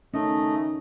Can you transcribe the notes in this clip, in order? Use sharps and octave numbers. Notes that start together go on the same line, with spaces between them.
D#3 A3 C#4 D#5